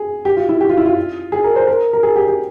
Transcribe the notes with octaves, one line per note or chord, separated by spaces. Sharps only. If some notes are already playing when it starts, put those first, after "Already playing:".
Already playing: G#4
G4
F4
E4
G4
F4
E4
F4
G#4
A#4
C5
A#4
A#4
G#4
G4
G4